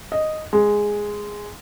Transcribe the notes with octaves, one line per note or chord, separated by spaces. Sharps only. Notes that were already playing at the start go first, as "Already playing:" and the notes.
D#5
G#3